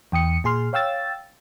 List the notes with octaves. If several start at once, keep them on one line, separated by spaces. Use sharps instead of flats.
E2 G5 D#6 C#7
A#2 G#4 C6 F6
C#5 F5 G5 E6 A6